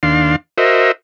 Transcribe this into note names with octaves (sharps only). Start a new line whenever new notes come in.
D#2 D4 F5 C6
F#4 A#4 C5 D#5 E5